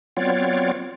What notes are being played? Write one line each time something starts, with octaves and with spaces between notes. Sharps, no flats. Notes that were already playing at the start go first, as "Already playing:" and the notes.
F#3 B3 C4 F4 C#5 D5